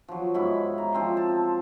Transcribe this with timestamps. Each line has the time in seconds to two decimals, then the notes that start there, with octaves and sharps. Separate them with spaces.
0.08 F3 F#3
0.34 G#2 E4 B5 C#6
0.78 A#5
0.93 F3 C4 A5 C6
1.17 A5